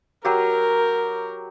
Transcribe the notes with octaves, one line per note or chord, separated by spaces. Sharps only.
F#3 G4 A#4